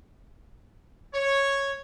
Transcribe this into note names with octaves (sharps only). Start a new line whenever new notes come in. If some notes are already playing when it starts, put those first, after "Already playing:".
C#5